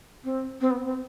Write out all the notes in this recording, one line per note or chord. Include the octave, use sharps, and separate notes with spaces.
C4
C4
B3
C4